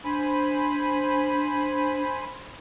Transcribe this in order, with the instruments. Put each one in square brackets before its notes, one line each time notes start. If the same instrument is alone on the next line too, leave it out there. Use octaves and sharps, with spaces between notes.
[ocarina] D4 [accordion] C5 G#5 B5